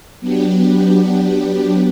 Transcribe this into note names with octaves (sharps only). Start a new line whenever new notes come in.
F#3 B3 D4 G4